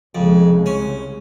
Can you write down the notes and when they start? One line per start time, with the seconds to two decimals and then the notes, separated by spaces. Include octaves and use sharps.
0.15 C2 F2 C#3 G#3
0.66 C#4